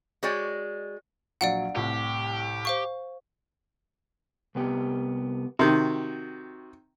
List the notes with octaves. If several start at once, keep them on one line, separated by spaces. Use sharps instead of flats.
G#3 F#4 C#5 D5 G5
A#1 F#3 D5 F5 F#5 D7
C2 A2 G4
C5 F5 C#6
C2 B3 G4
C3 D#3 F#4